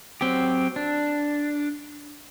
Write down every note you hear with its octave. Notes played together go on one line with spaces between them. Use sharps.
F#3 C4 G4
D4